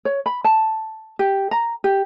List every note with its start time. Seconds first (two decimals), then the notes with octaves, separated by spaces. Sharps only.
0.05 C#5
0.26 B5
0.44 A5
1.19 G4
1.51 A#5
1.84 G4